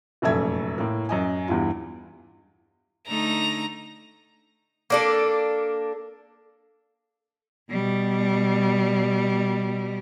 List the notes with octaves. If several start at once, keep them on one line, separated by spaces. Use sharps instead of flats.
F1 A#1 F#2 A3 E5 G#6
A2 A#3
F#2 D#5 G#5
E2 G2 E4 F4
D3 A3 D#4 A#5
A#3 D4 A4
B2 G3